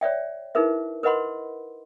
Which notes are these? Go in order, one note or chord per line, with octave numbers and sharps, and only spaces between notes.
C#5 D5 E5 G5
D#4 E4 G#4 A#4 B4 E5
A#4 B4 D#5 F#5 B5 C6